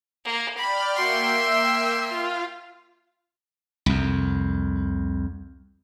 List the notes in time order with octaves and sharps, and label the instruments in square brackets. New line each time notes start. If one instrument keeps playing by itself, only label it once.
[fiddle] A#3
[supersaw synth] D5 G5 F6 [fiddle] B5
[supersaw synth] A#3 E5 G5 [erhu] F#4 [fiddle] C6
[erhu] E6
[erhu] F4 [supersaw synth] F5
[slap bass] C2 F2